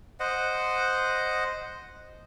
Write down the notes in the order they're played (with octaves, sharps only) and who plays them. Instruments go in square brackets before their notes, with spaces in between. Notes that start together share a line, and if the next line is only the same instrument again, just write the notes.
[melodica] C5 D#5 F#5